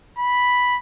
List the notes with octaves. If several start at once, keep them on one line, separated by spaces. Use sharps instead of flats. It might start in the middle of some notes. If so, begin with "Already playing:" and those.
B5